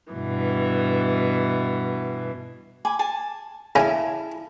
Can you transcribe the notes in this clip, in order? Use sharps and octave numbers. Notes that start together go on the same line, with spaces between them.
G2 B2 E3
G#5 B5 D6
G#5 A5
C#3 E4 G4 A4 G#5 A#5